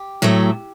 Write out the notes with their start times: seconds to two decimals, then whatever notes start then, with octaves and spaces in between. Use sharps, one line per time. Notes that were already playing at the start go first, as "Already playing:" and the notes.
Already playing: G4
0.22 A2 F#3 A3